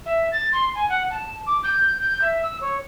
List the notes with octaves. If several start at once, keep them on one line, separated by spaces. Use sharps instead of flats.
E5
A6
C6
G#5
F#5
A5
D6
G6
G6
E5
E6
C#5